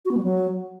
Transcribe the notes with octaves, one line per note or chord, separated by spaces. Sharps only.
F#4
B3
G3
F#3